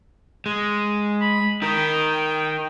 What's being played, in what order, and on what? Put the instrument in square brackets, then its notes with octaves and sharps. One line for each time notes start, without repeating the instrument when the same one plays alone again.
[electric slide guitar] G#3
[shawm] B5
[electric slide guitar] D#4 A#4 [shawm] G5